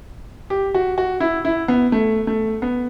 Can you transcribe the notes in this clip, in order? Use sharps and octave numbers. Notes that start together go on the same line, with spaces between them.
G4
F#4
F#4
E4
E4
B3
A3
A3
B3